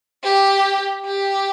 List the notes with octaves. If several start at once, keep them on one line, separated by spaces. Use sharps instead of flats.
G4
G4